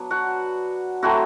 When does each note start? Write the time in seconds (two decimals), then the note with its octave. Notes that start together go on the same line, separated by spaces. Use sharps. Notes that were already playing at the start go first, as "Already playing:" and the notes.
Already playing: F#3 B3 D4
0.11 F#4 F#5
1.02 F#3 A3 C4 E4 F#4 F#5